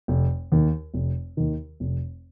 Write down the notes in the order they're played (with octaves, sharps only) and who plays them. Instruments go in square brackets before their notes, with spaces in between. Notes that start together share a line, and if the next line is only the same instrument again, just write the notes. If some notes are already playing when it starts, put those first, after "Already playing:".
[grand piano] F1
D#2 D#3
F1
D#2 D#3
F1